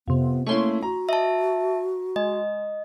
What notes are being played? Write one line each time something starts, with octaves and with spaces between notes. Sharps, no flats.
F2 C3 B3
A3 A#3 C#4 E4 C6 C#6
F#4 A#5
D#5 E5 A5
G#3 D#5